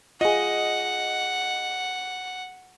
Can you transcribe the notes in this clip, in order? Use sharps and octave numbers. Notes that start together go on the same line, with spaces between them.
F4 G#4 D#5 F#5